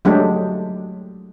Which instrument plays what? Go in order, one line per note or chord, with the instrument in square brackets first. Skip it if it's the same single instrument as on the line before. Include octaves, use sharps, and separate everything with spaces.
[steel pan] F#3 G#3 A3 D4 G4